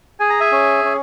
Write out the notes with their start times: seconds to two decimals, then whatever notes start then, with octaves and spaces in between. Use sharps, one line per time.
0.20 G#4 G#5
0.30 A#5
0.40 E5 G#5
0.52 C#4
0.85 C#4